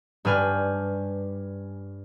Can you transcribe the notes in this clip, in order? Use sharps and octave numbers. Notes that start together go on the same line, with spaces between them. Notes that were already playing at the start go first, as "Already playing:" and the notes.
G2 D4 B4 G#5 F6 G6